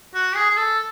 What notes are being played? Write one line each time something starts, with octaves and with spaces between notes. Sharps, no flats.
F#4
G#4
G#4
A4